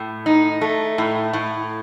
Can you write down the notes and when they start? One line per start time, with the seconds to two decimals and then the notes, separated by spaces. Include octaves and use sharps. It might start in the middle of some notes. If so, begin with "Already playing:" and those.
Already playing: A2
0.26 D#4
0.61 A3
0.98 A2
1.33 A2